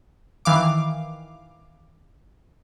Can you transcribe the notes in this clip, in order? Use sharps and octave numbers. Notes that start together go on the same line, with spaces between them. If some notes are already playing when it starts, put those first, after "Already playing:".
D#3 E3 F5 D6